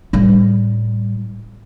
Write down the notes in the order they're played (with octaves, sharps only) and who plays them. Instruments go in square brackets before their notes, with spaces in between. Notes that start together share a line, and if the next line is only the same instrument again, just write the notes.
[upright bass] A2 G3